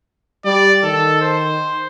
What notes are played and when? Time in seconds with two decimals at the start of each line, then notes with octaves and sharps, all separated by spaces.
0.45 G3 D5
0.84 D#3 A4
1.22 C5